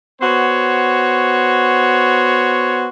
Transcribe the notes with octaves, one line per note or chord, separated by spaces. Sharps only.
B3 F#4 C5 C#5